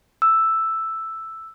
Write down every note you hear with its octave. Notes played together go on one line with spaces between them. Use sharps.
E6